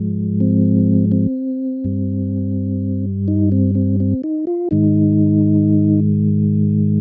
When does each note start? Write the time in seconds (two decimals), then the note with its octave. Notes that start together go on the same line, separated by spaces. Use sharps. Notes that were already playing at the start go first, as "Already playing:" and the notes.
Already playing: G#2 F3 G#3
0.40 C4
1.12 C4
1.84 G2 G3
3.28 D#4
3.52 C4
3.75 C4
4.00 C4
4.24 D#4
4.47 F4
4.71 G#2 D#3 G#3 D#4